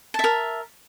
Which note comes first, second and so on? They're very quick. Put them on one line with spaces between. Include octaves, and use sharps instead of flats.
A5 E5 A#4